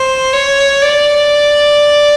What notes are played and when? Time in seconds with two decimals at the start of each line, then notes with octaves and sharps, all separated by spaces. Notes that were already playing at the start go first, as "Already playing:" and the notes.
Already playing: C5
0.33 C#5
0.82 D5